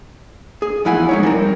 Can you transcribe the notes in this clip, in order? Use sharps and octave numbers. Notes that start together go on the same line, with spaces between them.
G#4
E2 F3 E4 F#5 G#5
G#3 D#4 C#5
G3 C4 A#4